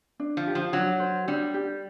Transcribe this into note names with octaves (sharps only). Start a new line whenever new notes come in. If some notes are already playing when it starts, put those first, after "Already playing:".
D4
F3
G4
F3
F#3 D4
C5
G3 D4
G4